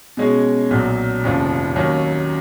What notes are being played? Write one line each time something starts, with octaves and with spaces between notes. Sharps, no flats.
B2 G#3 C#4 G#4
B1 A#2 F#3
F1 D#2 C#3 F3
D#2 D#3 F#3 C#4